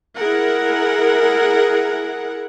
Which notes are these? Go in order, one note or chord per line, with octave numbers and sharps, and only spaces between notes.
E4 G#4 A#4 F#5